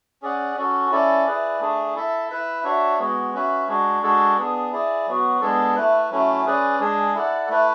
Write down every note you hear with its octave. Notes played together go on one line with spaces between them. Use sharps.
C#4 G#4 D5 F#5
C#4 F#4 A4
C#4 E4 A4 D5
E4 G#4 B4 D5
A3 D4 G#4
E4 A4 E5
E4 B4 E5
D4 F#4 C#5 E5
G#3 B3 F#4
C#4 F#4 B4 E5
G#3 D4 F#4
G#3 D4 F#4 A4
B3 D4 G#4
E4 G#4 D5
F#3 B3 F#4
G#3 B3 D4 A4
A3 E4 B4
F#3 A3 C#4 E4
C#4 G#4 B4 D5
G#3 D4 G#4
E4 A4 D5 F#5
A3 E4 B4